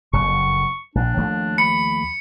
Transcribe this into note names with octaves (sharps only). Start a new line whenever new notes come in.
F#1 F2 C#6
A#1 D4
D#2 F3 A3
B5 C#7